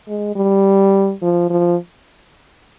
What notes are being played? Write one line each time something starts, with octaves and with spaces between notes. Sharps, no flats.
G#3
G3
F3
F3